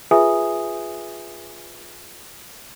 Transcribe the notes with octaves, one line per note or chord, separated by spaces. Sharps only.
F4 G#4 B4 E5 G#5 D#6